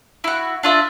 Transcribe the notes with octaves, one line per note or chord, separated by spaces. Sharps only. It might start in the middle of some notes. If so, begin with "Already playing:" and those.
E4 F#4
D4 F4 E5